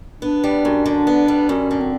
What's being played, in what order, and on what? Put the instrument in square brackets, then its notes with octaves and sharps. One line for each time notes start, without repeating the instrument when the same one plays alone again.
[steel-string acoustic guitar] B3 [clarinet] D4
[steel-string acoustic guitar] G3
F#2
D3
B3
G3
[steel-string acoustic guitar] F#2 [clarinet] C#4
[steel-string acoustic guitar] D3
[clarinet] C4